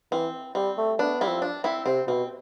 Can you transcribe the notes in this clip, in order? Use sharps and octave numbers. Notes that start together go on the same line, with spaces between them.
E3 C4
G3 C4
A3
B3 D4
G3 C4 E4
F3
D4
C4 E4
C3 C4
B2 C4